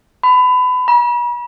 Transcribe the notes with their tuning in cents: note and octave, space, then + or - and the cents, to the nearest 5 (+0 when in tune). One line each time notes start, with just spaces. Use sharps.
B5 +25
B5 -40